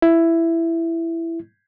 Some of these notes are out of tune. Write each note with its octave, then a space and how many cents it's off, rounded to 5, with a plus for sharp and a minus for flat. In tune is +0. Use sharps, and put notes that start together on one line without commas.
E4 +10